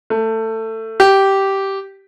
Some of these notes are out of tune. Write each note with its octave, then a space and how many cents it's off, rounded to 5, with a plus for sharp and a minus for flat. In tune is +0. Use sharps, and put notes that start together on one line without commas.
A3 +20
G4 -10